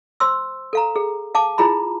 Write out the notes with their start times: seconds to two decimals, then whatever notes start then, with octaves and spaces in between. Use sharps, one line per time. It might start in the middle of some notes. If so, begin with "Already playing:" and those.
0.20 C5 C6 E6
0.73 A4 F5 A#5
0.96 G#4
1.35 F5 A5 D6
1.58 E4 F4 G#4 A#5 B5